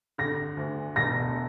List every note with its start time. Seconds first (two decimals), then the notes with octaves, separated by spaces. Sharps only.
0.18 D3 A#6
0.57 D2
0.96 E1 A#6